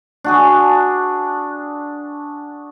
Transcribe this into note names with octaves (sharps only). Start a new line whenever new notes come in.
D4 F#4 G#4